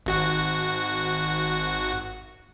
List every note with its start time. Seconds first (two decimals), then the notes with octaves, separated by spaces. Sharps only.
0.06 G#1 F#4 F#5